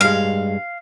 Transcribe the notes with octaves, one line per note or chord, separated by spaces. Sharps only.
G2 G#3 F5